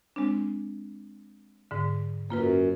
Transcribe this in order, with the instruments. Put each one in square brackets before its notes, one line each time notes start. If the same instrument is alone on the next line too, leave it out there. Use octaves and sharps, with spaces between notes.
[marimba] G#3 C4 D4
G#2 D3
[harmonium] F#2 [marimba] A#3 F4 B4